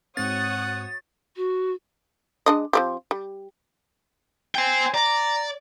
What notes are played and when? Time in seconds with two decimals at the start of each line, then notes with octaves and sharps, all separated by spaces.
0.17 G#2 C4 F#4 C#5 F#5 D#6 A6
1.36 F#4
2.46 G#3 D4 D#5
2.73 F3 C4 G4
3.11 G3
4.55 C5 G5 G#5
4.94 D5 A#5